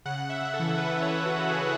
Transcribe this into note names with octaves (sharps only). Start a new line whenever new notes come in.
C#3 F#5
C#3
E5
C#3
A4
E3
C#3 B4
E3
C#5
E3
F#4
E3
C#3 G#4